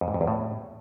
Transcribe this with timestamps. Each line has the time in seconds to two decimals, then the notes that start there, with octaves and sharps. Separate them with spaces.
0.01 F2
0.08 G#2
0.14 F2
0.21 E2
0.27 A2